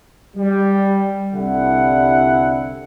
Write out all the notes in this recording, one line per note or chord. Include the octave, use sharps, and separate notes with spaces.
G3
C2 D3 G3 E4 F#5